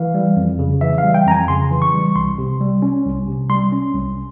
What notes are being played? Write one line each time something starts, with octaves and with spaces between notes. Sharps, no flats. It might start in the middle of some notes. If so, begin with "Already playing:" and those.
Already playing: E3 F5
G3
F2
C#3
E3 E5
F5
G3
G5
F2 G#5 A#5
C#3 C6
E3
C#6
G3
C2 C6
C3
G3
C#4
C2
C3
G3 C6
C#4
C2